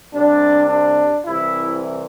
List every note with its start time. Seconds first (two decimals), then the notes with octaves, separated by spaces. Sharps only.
0.14 C2 C3 G3 D4
0.69 D4
1.25 C2 C3 E3 E4